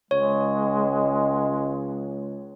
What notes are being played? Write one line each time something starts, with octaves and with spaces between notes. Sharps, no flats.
C#2 G#3 C#5